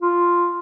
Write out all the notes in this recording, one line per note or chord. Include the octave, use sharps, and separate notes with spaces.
F4